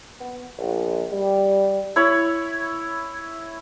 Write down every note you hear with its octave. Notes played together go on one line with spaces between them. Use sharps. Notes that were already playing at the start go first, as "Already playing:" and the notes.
B3
A#1
G3
E4 C#5 B5